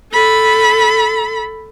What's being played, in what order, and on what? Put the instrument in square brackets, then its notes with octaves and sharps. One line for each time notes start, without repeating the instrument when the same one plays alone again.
[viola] A4 B5